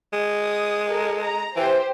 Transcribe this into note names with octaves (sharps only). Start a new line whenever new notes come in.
G#3
D#6
A4 A#4
A#5
E3 G4 C5